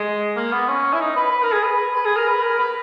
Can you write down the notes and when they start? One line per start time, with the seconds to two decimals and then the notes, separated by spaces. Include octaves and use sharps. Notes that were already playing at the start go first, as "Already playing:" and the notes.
Already playing: G#3
0.36 A#3
0.51 B3
0.68 C#4
0.93 E4
1.00 D#4
1.16 B4
1.31 B4
1.42 A#4
1.52 G#4
1.63 B4
1.95 B4
2.06 G#4
2.16 A#4
2.27 B4
2.42 A#4
2.59 B4